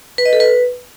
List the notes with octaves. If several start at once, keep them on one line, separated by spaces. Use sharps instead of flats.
B4
D#5
A4
B4